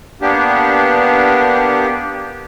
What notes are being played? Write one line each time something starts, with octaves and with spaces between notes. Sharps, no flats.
A#3 B3 D4 G4